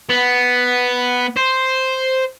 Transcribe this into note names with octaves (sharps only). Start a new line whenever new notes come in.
B3
C5